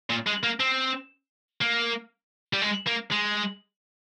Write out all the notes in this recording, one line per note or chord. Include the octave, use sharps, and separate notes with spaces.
A#2
G#3
A#3
C4
A#3
G3
G#3
A#3
G#3